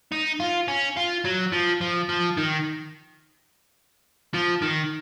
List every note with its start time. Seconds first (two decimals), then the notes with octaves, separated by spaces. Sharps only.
0.12 D#4
0.40 F4
0.68 C#4
0.97 F4
1.25 F#3
1.53 F3
1.81 F3
2.09 F3
2.37 D#3
4.34 F3
4.62 D#3